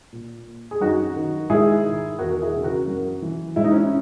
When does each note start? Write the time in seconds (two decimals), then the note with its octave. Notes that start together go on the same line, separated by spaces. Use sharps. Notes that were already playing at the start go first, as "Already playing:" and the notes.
0.12 A#2
0.71 G#4
0.81 F#2 D#4 F#4
1.16 D#3
1.50 G#2 E4 G#4
1.84 D#3
2.19 E2 F#4 A#4
2.31 A#4
2.41 E4 G#4
2.53 C#3 E3
2.64 F#4 A#4
2.87 F#2
3.22 E3
3.56 G#2 E4
3.64 D#4
3.71 C#4 E4